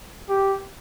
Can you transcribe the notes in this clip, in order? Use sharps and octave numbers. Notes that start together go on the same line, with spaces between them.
G4